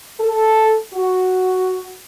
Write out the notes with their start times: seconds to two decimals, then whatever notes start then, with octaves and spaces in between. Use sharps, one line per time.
0.20 A4
0.94 F#4